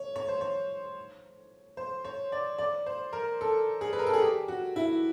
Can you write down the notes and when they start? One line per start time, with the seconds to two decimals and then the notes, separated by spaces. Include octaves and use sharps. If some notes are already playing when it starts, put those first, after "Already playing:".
Already playing: C#5
0.16 C#5
0.28 C5
0.41 C#5
1.77 C5
2.05 C#5
2.32 D5
2.58 D5
2.86 C5
3.13 A#4
3.41 A4
3.81 G#4
3.93 B4
3.99 A#4
4.07 A4
4.14 G#4
4.21 G4
4.48 F#4
4.76 E4